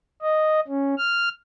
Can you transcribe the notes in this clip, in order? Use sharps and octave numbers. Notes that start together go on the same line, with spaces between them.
D#5
C#4
F6